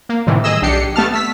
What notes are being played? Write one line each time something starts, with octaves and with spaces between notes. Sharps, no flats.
A#3
A2 C3 D#3 E3 G3
G#4 D#5 E6
B1 D4 G4 C7 C#7
A3 B3 A5 F6
E6 B6